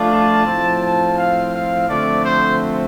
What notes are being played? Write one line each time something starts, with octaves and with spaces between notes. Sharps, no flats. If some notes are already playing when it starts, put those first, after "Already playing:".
Already playing: F3 A3 D4 F4
A5
A2 F3 C4 F4
A5
F5
F5
D3 F3 A3 C4 D5
C5